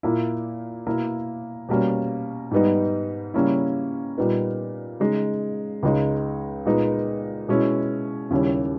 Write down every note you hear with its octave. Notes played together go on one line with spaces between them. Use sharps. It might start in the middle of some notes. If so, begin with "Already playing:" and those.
A#2 A#3 E4
B2 A#3 E4
B2 G3 A#3 C#4
G#2 G3 B3 D#4
C#3 G3 A#3 C#4 E4
A#2 G3 B3 D#4
C#3 G#3 D#4
C#2 C#3 G#3 D#4
A#2 G#3 B3 D#4
B2 G#3 C#4 E4
D#2 C#3 G3 C#4 E4